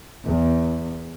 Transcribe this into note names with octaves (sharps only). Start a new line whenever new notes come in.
E2